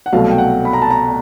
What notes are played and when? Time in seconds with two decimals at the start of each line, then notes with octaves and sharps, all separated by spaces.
0.06 F#5
0.12 C2 B2 F#3 A3 F5
0.31 G5
0.38 F#5
0.65 B5
0.73 A#5
0.82 A5
0.90 A#5